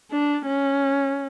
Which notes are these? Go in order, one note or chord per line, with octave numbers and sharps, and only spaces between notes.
D4
C#4